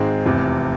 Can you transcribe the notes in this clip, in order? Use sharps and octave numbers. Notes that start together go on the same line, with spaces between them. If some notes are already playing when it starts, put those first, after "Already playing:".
Already playing: G#1 G#2 G#3 C4
F1 E2 C3